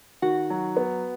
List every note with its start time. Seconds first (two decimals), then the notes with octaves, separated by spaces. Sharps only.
0.22 D#3 F#4 F#5
0.50 F#3
0.77 B3